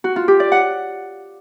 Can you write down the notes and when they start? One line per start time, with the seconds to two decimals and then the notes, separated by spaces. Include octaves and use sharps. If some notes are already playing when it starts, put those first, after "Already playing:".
0.04 F#4
0.16 F4
0.28 G4
0.40 D5
0.52 F#5